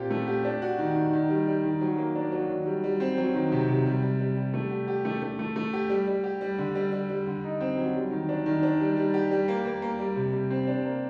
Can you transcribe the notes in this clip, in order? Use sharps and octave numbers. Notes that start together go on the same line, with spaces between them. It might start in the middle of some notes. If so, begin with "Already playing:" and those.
Already playing: A#2 C4 G4
A3
G4
D4
F#4
D#3
D#3
D#3
G3
G3
D#3
F#3
A#3
D4
F#3
D#3
G3
G3
C4
F#3
D#3
C3
C3
G3
G3
G3
G3
A3
G4
G4
A3
A3
A3
A3
G4
G3
G3
G4
G3
D3
G3
G3
G3
D3
D#4
C4
F#3
G3
D#3
D4
D#3
D4
G3
G3
G4
G3
A#3
A#3
A#3
G3
C3
G3
C4
D4
A#3